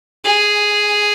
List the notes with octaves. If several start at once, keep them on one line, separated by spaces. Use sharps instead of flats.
G#4